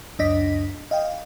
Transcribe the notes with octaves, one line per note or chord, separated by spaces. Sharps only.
C#2 F#2 D4 D#5 A#6 B6
D#5 F5 G5